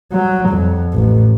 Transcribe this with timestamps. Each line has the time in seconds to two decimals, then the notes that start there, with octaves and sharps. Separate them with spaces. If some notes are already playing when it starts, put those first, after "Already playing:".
0.12 F#3
0.49 F2
0.93 A1